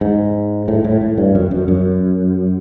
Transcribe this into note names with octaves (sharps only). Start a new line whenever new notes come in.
G#2
A2
A2
A2
G2
F#2
F#2
F#2